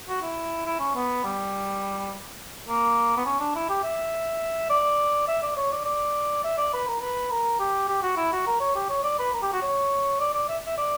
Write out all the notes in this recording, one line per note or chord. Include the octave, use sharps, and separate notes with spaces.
F#4
E4
E4
C#4
B3
G3
A#3
B3
C#4
D4
E4
G4
E5
D5
E5
D5
C#5
D5
D5
E5
D5
B4
A#4
B4
A#4
G4
G4
F#4
E4
F#4
A#4
C#5
G4
C#5
D5
B4
A#4
G4
F#4
C#5
D5
D5
E5
E5
D5